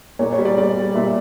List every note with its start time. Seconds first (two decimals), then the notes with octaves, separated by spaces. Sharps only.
0.19 A#2 C#5
0.33 C#5
0.39 G3
0.45 D5
0.57 A#2 D5
0.76 G3
0.95 A#2 E5